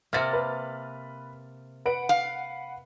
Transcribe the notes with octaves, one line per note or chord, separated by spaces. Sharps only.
C3 A#3 F6 A6
B4
B4 F#5 D7
F5